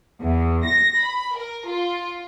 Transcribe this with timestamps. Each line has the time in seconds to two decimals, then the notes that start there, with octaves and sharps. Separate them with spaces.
0.22 E2
0.66 A#6
0.99 B5
1.36 A#4
1.68 F4